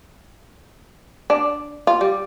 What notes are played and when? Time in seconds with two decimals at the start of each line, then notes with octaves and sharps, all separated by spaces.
1.30 D4
1.87 F4
2.01 G3